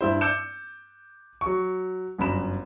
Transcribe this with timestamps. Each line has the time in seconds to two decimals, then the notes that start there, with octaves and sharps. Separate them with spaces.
0.01 G2 E4 C5
0.21 D6 E6 G6 C#7 E7
1.41 F#3 C#6
2.18 G1 F#2 A#5 B5 E7